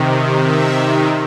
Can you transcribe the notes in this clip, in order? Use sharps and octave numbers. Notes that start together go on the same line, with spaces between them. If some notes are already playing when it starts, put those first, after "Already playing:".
Already playing: C3 D#3
E5